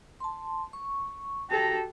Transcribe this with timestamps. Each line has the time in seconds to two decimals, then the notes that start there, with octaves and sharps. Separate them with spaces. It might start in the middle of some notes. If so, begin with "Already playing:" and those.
0.20 A5 C6
0.73 C#6
1.50 F#4 G4 A4 A5 A#5